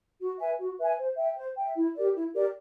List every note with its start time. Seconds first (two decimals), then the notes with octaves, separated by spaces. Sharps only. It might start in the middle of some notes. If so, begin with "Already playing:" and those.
0.20 F#4
0.40 B4 E5 G#5
0.59 F#4
0.78 B4 E5 G#5
0.98 C5
1.17 E5 G5
1.37 C5
1.57 E5 G5
1.76 E4
1.95 G4 A#4 D5
2.14 E4
2.34 G4 A#4 D5